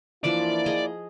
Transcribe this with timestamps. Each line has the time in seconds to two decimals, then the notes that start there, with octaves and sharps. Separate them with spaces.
0.24 E3 F3 A#3 D4 E4 F4 D5
0.66 G#4 D#5 A#5